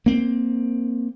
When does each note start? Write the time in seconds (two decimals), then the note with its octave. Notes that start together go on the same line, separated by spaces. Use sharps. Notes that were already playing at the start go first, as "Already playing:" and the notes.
0.06 A#3 C4